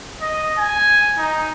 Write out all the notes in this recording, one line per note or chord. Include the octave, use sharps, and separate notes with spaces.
D#5
G#5
D#4